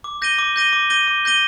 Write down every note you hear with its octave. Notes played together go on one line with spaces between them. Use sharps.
D6
G6 A#6 D#7 G7
D6
G6 A#6 D#7 G7
D6
G6 A#6 D#7 G7
D6
G6 A#6 D#7 G7